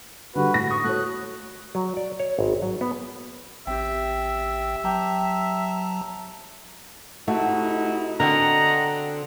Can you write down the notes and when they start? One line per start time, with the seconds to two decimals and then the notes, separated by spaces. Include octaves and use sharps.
0.35 D3 G3 F#4 B4
0.54 A2 A#6
0.70 C#6 D#6
0.84 A3 F#4 C#5 F#6
1.75 F#3
1.97 D5
2.20 C#5
2.39 G#1
2.62 F#3
2.81 B3
3.67 A1 C4 G4 E5 G5
4.84 F#3 G5 A5 A#5 D6
7.28 C3 A3 D#4 E4 F#4
8.20 B2 D3 C4 C5 D#5 F#5 A#5